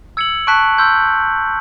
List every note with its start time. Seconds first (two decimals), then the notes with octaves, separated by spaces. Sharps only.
0.17 E6 G#6 C#7 F#7
0.47 A5 C#6 F#6 B6 D7
0.78 C6 E6 G6